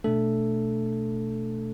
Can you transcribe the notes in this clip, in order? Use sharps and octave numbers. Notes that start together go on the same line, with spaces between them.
B2 A3 D4 A4